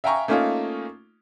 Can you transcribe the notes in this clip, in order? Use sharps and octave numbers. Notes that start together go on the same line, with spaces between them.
E5 F5 G5 G#5 A#5 C#6
A3 A#3 C#4 D#4 F4